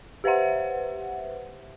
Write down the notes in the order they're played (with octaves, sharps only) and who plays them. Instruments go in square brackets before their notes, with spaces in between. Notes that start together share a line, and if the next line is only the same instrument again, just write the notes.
[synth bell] G4 B4 C5 E5 F#5